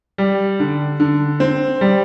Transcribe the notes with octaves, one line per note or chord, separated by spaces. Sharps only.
G3
D3
D3
C4
G3